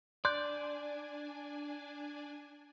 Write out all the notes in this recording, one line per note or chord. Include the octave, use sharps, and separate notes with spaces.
D4 D5 G#5 C6 F#6 G6